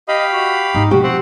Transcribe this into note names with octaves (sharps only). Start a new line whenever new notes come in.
G4 D#5 F5 B5
F#4
G#2 C4 D#4
B2 F3 F#4 G4
C4 F#5